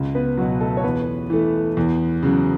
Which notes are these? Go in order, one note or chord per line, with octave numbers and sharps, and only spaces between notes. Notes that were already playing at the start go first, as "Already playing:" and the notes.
Already playing: C#2
B3 B4
B2 F#3 F#4
A3 A4
C#5
E2 B3 B4
E3 A3
E2
C#3 F#3